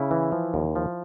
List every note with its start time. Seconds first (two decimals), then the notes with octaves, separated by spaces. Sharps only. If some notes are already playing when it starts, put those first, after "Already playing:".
Already playing: C#3 E4
0.11 E3
0.32 F3
0.54 D#2
0.76 F3